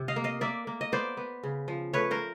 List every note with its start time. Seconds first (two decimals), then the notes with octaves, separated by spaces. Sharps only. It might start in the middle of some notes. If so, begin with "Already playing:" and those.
Already playing: C3
0.08 D#5 F5
0.16 A#3
0.24 D#5 F5
0.41 A#3 D5 E5
0.67 A#3
0.81 D#5
0.92 B3 C5 D5
1.17 B3
1.43 C#3
1.68 F3
1.93 A3 B4 C#5
2.11 A#4 C5